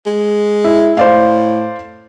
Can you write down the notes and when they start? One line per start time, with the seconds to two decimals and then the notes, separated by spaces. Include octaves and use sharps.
0.06 G#3
0.64 E4
0.97 A2 C5 D5 F5